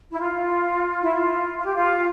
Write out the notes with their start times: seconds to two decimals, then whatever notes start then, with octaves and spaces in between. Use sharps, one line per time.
0.11 E4
0.19 F4
1.02 E4
1.11 F4
1.57 F4
1.65 G4
1.74 F4